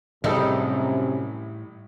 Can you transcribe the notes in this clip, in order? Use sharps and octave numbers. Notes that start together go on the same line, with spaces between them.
A1 F#2 A2 C3 G3 D#4 G#4 A4